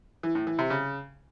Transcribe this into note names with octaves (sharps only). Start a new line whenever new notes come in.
E3
A2
E3
C3
C#3